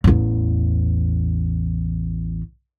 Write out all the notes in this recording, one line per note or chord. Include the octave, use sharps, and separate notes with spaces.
A1 E2